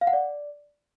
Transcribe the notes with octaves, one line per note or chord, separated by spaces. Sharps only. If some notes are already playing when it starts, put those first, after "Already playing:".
F5
F#5
D5